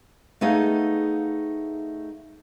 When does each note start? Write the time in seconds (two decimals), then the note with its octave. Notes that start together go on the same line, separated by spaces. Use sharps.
0.41 A3 B3 D#4 G#4 F5